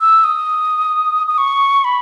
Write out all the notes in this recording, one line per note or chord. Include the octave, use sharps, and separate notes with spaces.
E6
D#6
D#6
C#6
B5